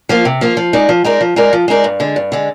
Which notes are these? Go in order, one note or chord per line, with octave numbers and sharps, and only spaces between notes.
F3 A#3 F4
C3
F3 A#3 F4
F3
G#3 D#4 A#4 D5
F3
G#3 D#4 A#4 D5
F3
G#3 D#4 A#4 D5
F3
G#3 D#4 A#4 D5
G2
D3 G#3
G2
D3 G#3